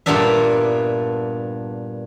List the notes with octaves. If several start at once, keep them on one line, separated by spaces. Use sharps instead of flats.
G2 A#2 A#3 B3 D4 E5